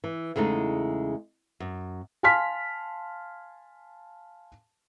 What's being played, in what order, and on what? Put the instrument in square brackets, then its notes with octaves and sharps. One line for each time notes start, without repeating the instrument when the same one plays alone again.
[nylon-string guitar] E3
E2 C#3 G#3 A3 D#4
F#2
[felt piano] F5 G#5 A5 C6 F6 B6